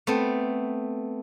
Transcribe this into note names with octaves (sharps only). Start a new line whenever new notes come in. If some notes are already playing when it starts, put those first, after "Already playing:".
A3 B3 C4